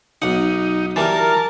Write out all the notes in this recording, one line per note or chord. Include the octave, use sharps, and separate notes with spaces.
B1 D#4 F#5
E3 G3 A#4 A5